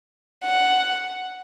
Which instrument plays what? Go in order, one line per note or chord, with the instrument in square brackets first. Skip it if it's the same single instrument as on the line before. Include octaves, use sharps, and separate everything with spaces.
[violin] F#5